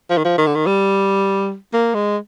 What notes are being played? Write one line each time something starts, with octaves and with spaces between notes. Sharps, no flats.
F3
D#3
F3
D#3
D3
D#3
G3
A#3
G#3